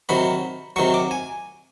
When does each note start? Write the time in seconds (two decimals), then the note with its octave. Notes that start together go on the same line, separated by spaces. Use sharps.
0.09 C3 D#3 F#3 B5
0.76 C3 D#3 F#3 C#6
0.94 D6
1.11 G#5